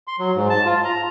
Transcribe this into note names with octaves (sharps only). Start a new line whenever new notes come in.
C6
F#3
G#2
A5
F4
A#5